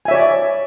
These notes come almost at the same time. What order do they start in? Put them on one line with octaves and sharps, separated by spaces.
G#5 E5 C#5 D5